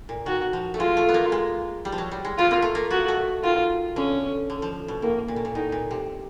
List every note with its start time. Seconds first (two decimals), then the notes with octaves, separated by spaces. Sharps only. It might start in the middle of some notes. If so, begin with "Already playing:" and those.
0.09 A#2
0.26 D#3 F#4
0.53 F3
0.74 A3
0.79 G#3 F4
0.97 A3
1.09 B3
1.14 A#3
1.32 G#3
1.85 G3
1.92 F3
1.98 F#3
2.11 G3
2.25 G#3
2.38 B3 F4
2.51 A#3
2.62 A3
2.75 A#3
2.91 B3 F#4
3.08 A3
3.43 D#3 F4
3.96 D3 C#4
4.50 D3
4.62 F3
4.88 B2
5.02 A2 A#3
5.28 A#2
5.36 B2
5.45 A#2
5.55 A2 D#4
5.72 A#2
5.91 C3